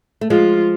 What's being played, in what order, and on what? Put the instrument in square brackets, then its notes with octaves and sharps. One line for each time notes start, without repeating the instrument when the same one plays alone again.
[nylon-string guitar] A3
[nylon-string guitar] F3 G#3 [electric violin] F4